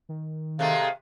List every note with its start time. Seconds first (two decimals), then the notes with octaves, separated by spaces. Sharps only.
0.09 D#3
0.59 C3 G#3 A3 F5